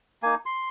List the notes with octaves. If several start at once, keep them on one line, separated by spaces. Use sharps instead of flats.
A#3 D#4 G#5
C6